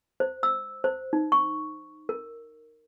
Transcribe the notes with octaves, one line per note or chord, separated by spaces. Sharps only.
C5
E6
C5
D#4
C#6
A#4